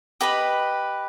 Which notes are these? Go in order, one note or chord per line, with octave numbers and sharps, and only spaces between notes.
G4 B4 D#5 B5